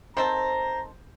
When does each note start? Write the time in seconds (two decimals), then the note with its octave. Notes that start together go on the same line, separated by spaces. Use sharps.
0.17 D#3 C4 A4 C5 A#5